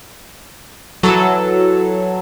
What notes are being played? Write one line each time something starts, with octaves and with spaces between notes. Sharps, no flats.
E3 F#3 A4